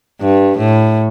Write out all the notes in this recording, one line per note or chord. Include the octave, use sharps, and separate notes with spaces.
G2
A2